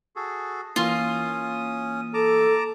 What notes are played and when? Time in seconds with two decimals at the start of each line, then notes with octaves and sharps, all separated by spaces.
0.16 F#4 G#4 A4
0.76 E3 A#3 C#4 F4 D#6
2.14 A4 A5 A#5 D6